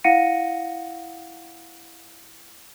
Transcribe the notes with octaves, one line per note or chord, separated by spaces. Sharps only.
E4 F5 F#5 A#6 C#7 D#7